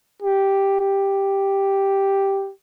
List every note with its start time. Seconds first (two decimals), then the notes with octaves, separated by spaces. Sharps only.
0.22 G4
0.80 G4